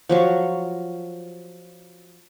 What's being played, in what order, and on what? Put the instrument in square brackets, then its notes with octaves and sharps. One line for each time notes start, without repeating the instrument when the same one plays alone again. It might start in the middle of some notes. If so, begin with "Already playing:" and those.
[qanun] F3 F#3 C#5